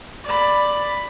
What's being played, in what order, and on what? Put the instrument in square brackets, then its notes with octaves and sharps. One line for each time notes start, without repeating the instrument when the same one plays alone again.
[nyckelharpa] D5 B5